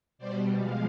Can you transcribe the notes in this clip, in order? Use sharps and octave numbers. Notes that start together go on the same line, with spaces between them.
B2 G3 C5 D5
F3 G#3 F5